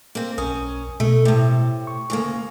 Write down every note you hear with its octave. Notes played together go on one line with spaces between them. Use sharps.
A#3 C4
B1 C#4 A#4 D#6
B2 A3
A2 C3
C#6
D2 C#3 A#3